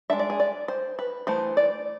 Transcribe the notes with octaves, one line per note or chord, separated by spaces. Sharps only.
G#3 D4 E5
D5
G#4
D5
C5
B4
E3 A3 C5
D5